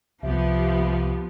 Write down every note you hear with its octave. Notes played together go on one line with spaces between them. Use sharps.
C2 F3 B3 G4 E5